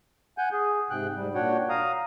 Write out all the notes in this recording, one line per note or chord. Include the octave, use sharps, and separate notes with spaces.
F#5 G#5 G6
G#4
G#2 C3 G5 F#6
G#2 G3
A#2 D4 F#4 C#5 F#5 G5
F5 A#5 D#6